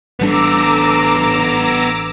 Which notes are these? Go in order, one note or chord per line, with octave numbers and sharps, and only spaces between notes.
A1 G3 B3 D4 A4 A#5 D6 E6